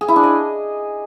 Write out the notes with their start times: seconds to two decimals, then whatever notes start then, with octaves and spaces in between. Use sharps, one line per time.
0.01 G#4
0.08 E4
0.16 D4
0.23 D#5